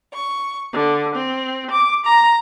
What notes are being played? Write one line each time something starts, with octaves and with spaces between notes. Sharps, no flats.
C#6
D3
C4
D6
A#5